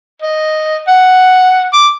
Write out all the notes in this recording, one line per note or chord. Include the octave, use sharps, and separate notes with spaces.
D#5
F#5
D6